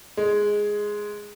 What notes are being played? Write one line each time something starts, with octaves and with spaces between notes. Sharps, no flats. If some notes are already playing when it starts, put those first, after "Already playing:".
G#3